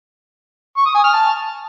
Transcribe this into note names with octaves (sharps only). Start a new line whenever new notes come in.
C#6
D#6
G#5
F6
A5